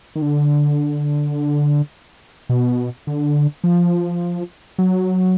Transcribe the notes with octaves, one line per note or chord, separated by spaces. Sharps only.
D#3
D3
B2
D3
F3
F#3